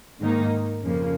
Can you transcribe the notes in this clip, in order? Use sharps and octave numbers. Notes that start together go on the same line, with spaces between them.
G#2 D#3 A#3 D#4
F2 C#3 F3 A#3